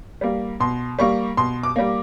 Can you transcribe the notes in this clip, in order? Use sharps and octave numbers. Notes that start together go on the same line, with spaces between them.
G3 A#3
B2 C6
G3 A#3 C#6
B2 C6
D6
G3 A#3